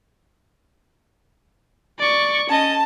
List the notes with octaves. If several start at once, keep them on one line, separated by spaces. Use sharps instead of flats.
D5 C#6
C#4 D#5 A5